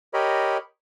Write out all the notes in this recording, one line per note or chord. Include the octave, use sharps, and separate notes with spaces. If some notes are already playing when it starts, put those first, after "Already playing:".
G4 A#4 C#5 D#5 B5